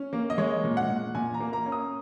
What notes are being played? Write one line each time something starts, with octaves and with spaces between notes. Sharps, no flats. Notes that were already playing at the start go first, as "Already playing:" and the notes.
Already playing: C#4
A#3
D#5
G#3 C#5
A#2
F#5
A#2
A#2 G#5
A#5
A#3
A#5
C#4
D#6